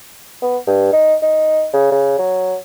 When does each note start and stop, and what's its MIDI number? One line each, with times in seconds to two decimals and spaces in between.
0.42 0.58 59
0.67 0.89 43
0.93 1.15 63
1.22 1.66 63
1.73 1.89 49
1.92 2.16 49
2.19 2.55 54